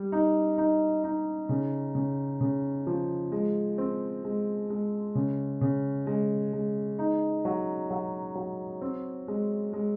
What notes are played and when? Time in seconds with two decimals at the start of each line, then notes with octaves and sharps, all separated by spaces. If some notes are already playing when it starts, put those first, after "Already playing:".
Already playing: G3
0.12 D#4
0.58 D#4
1.04 D#4
1.49 C#3
1.95 C#3
2.41 C#3
2.87 F3
3.32 G#3
3.78 C4
4.24 G#3
4.70 G#3
5.15 C#3
5.61 C#3
6.07 G#3
6.53 G#3
6.99 D#4
7.45 F#3
7.91 F#3
8.35 F#3
8.81 C4
9.28 G#3
9.73 G#3